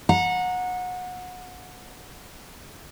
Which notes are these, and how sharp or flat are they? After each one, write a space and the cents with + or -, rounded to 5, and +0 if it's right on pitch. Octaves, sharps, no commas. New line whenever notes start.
F#5 -25 A#5 +0